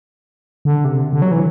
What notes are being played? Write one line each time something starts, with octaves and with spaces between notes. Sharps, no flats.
D3
C3
D3
F#3
E3